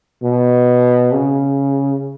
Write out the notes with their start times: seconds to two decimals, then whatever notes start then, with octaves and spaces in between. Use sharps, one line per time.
0.23 B2
1.14 C#3